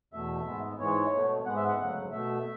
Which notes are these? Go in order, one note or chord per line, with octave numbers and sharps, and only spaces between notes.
E2 B2 A3 E5
G#2 G#3 B3
G#2 E3 G#3 C#5
B2 A3
G#2 G#3 B3 F#5
E5
F#5
D2 C#3 F#3 A3
B2 A3 E5